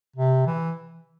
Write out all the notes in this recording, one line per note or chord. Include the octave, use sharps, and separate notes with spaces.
C3
E3